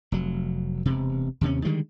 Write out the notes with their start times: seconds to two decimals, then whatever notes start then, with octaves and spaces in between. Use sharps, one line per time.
0.12 F1 F#3
0.85 E1 C3
1.41 D#2 C3 C#4
1.65 D3 D#3 G3 G#3